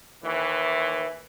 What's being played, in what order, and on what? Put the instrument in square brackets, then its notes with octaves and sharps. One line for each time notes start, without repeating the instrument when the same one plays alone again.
[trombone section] D#2 E3